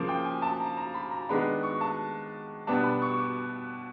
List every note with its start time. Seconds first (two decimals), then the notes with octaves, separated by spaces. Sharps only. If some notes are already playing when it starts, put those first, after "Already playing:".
Already playing: C#3 F3 A#3
0.08 G5
0.25 G#5
0.42 A5
0.60 A#5
0.77 A#5
0.94 B5
1.11 A#5
1.29 D#3 G#3 B3 D4 B5
1.63 C#6
1.81 A5
2.67 B2 G3 B3 D4 A5
2.84 B5
3.02 C#6
3.18 D6